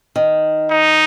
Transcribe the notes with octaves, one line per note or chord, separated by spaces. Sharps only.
D#3
D#4